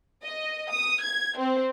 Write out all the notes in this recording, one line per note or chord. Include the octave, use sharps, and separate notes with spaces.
D#5
D#6
G#6
C4